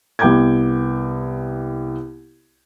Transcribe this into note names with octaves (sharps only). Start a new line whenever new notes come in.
C2 B3 G5 D6 G6 G#6